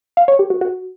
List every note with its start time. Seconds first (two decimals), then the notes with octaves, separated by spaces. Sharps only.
0.17 F5
0.28 C#5
0.39 G4
0.50 F#4
0.61 F#4